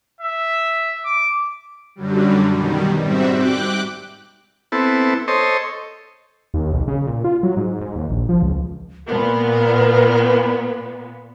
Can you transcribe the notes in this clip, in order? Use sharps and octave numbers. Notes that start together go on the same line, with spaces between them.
E5
D6
F#2 D3 F#3 G3
B2 D#3 G3
G#2 G3 C4 F#4 E5
G5 D6 F#6
B3 C4 E4 A4
A4 C5 C#5 D#5
D#2
B1
C#3
A#2
F4
F#3
G#2
G#2
D#2
A#1
F3
C#2
A#2 B3 A#4